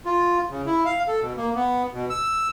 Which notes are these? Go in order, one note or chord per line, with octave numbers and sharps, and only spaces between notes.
F4
C#3
E4
F5
A4
B2
A#3
B3
B2
E6